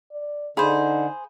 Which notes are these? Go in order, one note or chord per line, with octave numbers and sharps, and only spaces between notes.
D5
D3 D#4 G#4 C5 F5 B5